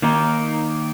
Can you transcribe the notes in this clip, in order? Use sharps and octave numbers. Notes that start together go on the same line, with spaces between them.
D#3 A#3 D#4